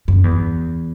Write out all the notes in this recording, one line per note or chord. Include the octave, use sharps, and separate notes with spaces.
F#2
E2